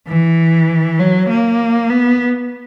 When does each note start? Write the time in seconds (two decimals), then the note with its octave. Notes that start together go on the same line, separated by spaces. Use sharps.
0.08 E3
0.99 F#3
1.30 A#3
1.90 B3